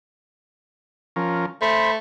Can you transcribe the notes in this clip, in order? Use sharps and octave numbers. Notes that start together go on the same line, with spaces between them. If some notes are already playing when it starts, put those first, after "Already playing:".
F3 C#4 A#4
A3 C5 B5